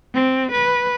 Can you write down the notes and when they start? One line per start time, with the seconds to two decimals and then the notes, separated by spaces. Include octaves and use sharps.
0.14 C4
0.51 B4